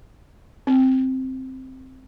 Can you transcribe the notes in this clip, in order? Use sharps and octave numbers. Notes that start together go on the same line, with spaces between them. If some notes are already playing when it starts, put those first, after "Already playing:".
C4